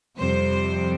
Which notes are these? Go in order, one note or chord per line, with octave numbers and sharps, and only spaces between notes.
F2 C3 G3 C5